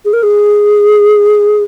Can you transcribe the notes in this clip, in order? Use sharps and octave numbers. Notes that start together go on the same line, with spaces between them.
G#4
A#4
G#4